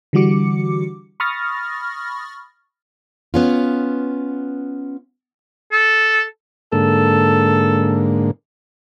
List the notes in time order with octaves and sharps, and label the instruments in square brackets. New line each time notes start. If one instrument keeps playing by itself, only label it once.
[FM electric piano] D3 E3 G3 F#4 D6 C#7
B5 C#6 D#6 F6 A6 A#6
[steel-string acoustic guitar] B3 C#4 F4
[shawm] A4
[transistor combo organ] G#2 D3 A#3 [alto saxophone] A4